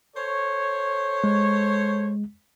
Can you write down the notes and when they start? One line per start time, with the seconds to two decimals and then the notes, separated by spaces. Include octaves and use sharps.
0.16 A4 C5 C#5
1.24 G#3